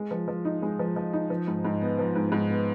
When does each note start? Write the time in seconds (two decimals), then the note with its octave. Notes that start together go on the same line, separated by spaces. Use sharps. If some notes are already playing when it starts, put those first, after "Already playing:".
Already playing: G#3
0.11 F3
0.28 F3
0.45 D#4
0.62 G#3
0.79 F3
0.96 F3
1.13 D#4
1.30 F3
1.47 G#2
1.65 G#2
1.81 B3
1.99 F3
2.16 G#2
2.32 G#2
2.50 B3